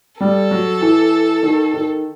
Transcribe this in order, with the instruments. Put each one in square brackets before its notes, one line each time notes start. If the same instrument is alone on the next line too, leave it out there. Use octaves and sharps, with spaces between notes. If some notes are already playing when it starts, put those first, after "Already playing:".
[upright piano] G3 [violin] A4
[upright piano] F#3
E3
D#3
D#3